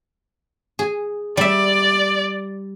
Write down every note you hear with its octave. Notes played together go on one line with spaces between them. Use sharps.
G#4
G3 D5 E5